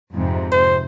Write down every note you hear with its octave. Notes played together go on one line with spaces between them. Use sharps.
F2 G#2 C3
C5